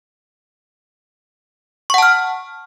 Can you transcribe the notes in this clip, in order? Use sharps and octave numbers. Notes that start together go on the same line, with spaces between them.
F#5 A5 C#6 F6